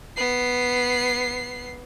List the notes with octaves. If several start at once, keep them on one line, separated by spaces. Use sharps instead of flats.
B3 C7